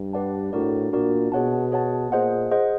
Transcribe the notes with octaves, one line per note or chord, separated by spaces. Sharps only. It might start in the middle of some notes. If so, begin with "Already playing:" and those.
Already playing: G2
G4 B4 D5 F#5 A5
A2 D4 F#4 A#4 D5
A#2 D4 F#4 A#4 D5
B2 G#4 C#5 F#5 A5
G#4 C#5 F#5 A5
A#2 G#4 C5 D#5 F#5
G#4 C5 D#5 F#5